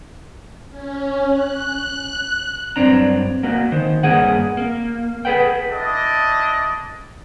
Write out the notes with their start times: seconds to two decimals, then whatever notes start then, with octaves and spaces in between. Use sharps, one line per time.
0.69 C#4
1.28 F#6
2.76 G2 F#3 C4 D4 A#5
3.43 A#3 F#4
3.72 D#3 C5
4.03 G2 A#3 G#4 F#5
4.57 A#3
5.25 G#4 A4 B4 F#5 G5
5.70 D4 E4 D5 D#5